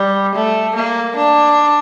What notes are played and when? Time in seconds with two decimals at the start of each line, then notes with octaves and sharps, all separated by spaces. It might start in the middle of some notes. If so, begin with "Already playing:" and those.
Already playing: G3
0.35 A3
0.75 A#3
1.16 D4